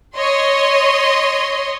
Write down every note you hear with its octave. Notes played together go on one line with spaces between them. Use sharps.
C#5 D#5 C6